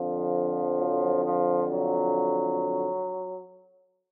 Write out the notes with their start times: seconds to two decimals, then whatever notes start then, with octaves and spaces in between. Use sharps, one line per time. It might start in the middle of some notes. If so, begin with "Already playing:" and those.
Already playing: F2 D3 F3
0.78 F#3
1.25 F3
1.72 F#3